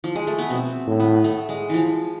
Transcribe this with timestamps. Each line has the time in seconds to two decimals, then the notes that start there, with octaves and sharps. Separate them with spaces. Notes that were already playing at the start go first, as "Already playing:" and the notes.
0.04 F3
0.15 G#3
0.27 A3
0.38 B3
0.50 B2 C4
0.87 A2
1.00 B3
1.24 A3
1.49 G#3
1.69 E3 F3